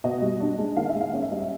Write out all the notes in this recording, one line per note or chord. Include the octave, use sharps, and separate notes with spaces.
B2 D#5
G3
D4
G#3
D#3 F5
E5
G#3
F5
C#4 F5
E5
G3 D#5
E5